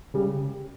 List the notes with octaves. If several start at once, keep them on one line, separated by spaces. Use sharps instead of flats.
C#3 G3